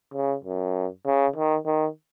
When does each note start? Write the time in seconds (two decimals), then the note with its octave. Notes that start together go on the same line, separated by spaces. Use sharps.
0.14 C#3
0.44 F#2
1.06 C#3
1.36 D#3
1.66 D#3